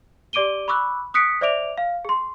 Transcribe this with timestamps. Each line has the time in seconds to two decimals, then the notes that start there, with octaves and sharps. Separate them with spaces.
0.33 G4 D5 D6 D7 D#7 G7
0.68 B5 C#6 D6 E6 F#6
1.14 D#6 F#6 B6 C#7 D7
1.41 C5 D5 E5 D6 D7 F7
1.78 F5
2.05 G#4 C6